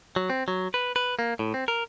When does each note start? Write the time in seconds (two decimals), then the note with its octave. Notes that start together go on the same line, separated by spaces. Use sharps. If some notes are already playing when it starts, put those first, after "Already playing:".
0.16 F#3
0.30 C4
0.48 F#3
0.74 B4
0.96 B4
1.19 A#3
1.39 A2
1.54 C4
1.68 A#4